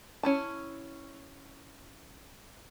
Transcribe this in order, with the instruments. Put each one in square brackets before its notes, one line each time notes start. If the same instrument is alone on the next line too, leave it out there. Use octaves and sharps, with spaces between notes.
[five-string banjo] C#4 E4 A5